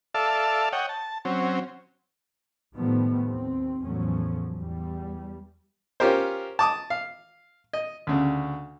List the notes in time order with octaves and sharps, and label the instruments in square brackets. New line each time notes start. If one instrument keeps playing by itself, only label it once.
[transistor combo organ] A4 D5 E5 F5 A5
C#5 D#5 F#5 G5
A5
F#3 C4 C#4
[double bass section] A2 D#3 F3 G3 A3 B3
D#2 C4
E2 A2 F3 F#3 A3 C#4
E2 G3
[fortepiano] C#4 F4 G4 A#4 C5
A5 D6 D#6
F5
D#5
D2 C#3